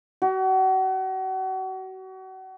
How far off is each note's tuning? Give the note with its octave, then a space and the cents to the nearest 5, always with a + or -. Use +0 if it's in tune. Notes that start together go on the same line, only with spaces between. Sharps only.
F#4 +35